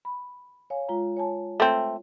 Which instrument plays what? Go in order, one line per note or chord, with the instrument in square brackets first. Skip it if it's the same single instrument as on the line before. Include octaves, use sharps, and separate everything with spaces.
[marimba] B5
C#5 F5 G#5
G#3 F4 A#5
C#5 G#5 A5
[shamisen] A3 C4